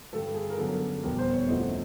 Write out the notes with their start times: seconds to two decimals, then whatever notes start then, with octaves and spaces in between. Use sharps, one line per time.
0.12 G2 D3 G3 A4
0.35 G#4
0.50 A#4
0.58 F#2 D3 F#3 B3 A4
1.03 F1 E2 B2 G3 B3 A#4
1.18 C5
1.33 C#5
1.48 D2 C3 F3 A3 D#5